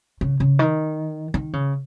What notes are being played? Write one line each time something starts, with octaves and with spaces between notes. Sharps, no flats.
C#3
C#3
D#3
D#3
C#3